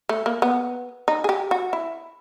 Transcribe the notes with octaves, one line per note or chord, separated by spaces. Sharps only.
A3
A#3
B3
D#4
G#4
G4
F#4
E4